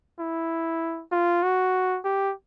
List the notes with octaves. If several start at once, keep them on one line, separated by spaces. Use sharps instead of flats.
E4
F4
F#4
G4